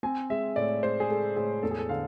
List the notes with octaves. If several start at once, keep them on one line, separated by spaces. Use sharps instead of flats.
C4 G#5
G#3 E5
A2 D5
G#3 C5
G#4
G#3 A4
A2 G#4
E2 A4
G#4
A4
D3 F5